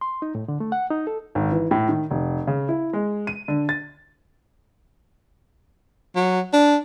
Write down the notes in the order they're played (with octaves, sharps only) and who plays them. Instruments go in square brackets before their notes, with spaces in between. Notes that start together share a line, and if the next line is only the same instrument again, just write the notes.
[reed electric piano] C6
D#4
A2
D3
A3
F#5
D#4
A4
[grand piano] G#1
E3
A2
D#3
F1
C#3
E4
G#3
D#7
D3
A6
[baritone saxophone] F#3
D4